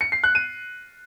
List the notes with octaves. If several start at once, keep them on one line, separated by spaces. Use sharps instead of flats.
C#7
C7
F#6
D#7